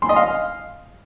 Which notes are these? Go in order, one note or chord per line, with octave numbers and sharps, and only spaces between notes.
C6
D#5
F5